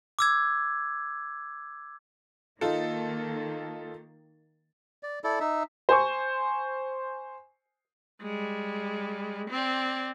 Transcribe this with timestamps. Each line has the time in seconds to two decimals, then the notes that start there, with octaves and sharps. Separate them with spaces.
0.19 D6 E6 G#6
2.61 D#3 A#3 D#4 F4 A4
5.03 D5
5.24 E4 A4 D5
5.40 D#4 E5
5.89 C5 G#5 C#6
8.21 G3 G#3
9.50 C4 D5